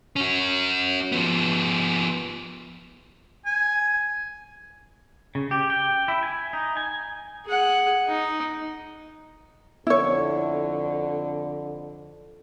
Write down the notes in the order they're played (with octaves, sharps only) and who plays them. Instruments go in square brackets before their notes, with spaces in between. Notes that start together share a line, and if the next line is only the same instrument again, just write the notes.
[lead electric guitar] C#4 F#4
F3 B3
[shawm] G#5
[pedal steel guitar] C#3
G4
G5
E4
G#5
D#4
G#5
[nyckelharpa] G#4 F#5
D#4
[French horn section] F2 D3 A4 [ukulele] E4 C#5